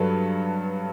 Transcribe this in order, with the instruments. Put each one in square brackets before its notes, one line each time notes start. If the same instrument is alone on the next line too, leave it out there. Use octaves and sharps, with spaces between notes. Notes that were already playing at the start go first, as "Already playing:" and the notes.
Already playing: [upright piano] G2 F#3 A4 B4